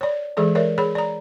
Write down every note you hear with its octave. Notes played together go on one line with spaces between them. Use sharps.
C#5 D5
E3 G#3 G#4 A4 D5
A#4 C#5 D5 E5
G#4 C#5 B5
D5 A#5